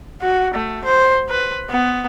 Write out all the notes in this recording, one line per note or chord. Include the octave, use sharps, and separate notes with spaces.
F#4
A3
C5
B4
B3